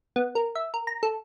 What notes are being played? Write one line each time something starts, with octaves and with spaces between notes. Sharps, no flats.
B3
A#4
E5
A#4
A#5
A4